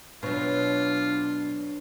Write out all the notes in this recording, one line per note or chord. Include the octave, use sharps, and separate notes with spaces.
B2 F#3 D4 F4 B4 C#5